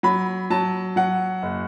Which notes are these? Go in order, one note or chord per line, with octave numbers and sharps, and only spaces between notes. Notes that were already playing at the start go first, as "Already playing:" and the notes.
F#3 B5
F#3 A5
F#3 F#5
F#1